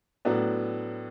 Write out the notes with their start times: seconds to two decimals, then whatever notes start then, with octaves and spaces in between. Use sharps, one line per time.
0.25 A2 F#3 B3 D4